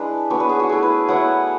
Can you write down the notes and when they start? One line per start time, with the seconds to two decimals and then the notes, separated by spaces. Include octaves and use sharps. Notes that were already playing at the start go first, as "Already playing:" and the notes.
Already playing: G#3 D4 E4 B4 D5
0.30 F#3 B3 D4 C#5
0.40 B4
0.49 G#4
0.60 F#4
0.69 A3 E4 G#4
0.83 B4
1.08 F#3 B3 E4 F#5